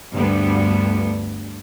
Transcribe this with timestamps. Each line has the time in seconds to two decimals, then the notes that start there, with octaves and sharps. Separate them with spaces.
0.12 D2 G2 D3 G3 B3